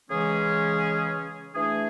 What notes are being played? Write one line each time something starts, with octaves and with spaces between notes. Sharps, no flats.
C#3 E3 G#3 C#4 G#4
E3 A3 D4 G#4